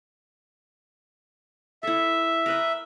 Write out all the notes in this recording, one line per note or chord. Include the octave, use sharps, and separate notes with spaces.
E4 A4 E5
A#4 B4 D#5